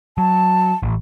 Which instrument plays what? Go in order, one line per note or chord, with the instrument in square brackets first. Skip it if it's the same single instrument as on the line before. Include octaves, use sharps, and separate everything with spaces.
[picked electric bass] F#3 [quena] A5
[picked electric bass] A1